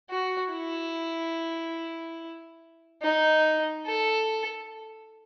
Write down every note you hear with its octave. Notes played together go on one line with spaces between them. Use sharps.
F#4
E4
D#4
A4